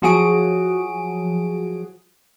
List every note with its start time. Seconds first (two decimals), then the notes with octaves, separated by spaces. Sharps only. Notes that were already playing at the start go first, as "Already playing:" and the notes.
0.02 F3 F#3 F#4 G#4 D#6 D7